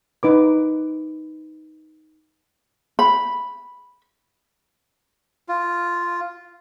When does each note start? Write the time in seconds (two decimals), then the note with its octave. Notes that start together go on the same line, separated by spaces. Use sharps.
0.23 D#4 B4 D6
2.99 B5
5.49 F4